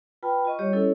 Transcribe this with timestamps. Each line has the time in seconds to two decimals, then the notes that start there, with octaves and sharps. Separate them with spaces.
0.23 F4 B4 G5 A5 B5
0.45 F4 D#5 C#6
0.59 G3 G4 C#5 D#5
0.73 C#4 E4 A4 C#5